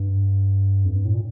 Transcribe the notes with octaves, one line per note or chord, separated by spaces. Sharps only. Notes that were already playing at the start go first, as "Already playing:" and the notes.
Already playing: G2
F2
G2
A2
A#2